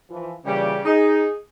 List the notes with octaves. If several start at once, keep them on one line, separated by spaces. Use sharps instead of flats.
E3 F3
A#2 C#3 E3 G3 G4
D#4 G#4